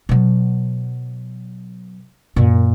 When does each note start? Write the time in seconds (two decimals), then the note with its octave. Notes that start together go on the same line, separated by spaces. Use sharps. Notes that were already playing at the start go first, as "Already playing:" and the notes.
0.09 B2 F#3
2.36 F#2 A#2